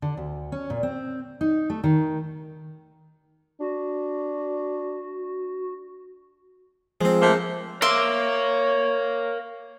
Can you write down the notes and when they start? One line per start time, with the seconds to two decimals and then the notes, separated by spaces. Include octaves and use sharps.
0.02 D3
0.17 D2
0.52 C#4
0.70 A#2
0.83 C4
1.41 D#4
1.70 A3
1.84 D#3
3.60 D4 F#4
7.01 F3 G#3 C4
7.21 A3 A#3 C5
7.82 A#4 C#5 E5 F5 C6 D6